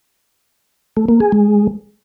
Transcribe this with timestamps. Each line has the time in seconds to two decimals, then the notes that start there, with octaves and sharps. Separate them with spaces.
0.97 A3
1.09 A#3
1.20 G#4
1.32 G#3